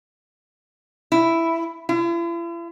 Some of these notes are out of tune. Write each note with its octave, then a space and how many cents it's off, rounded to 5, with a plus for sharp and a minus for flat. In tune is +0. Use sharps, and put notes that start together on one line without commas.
E4 +5
E4 +45